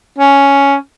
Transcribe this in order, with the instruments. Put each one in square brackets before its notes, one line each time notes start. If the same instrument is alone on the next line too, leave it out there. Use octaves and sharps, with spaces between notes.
[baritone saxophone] C#4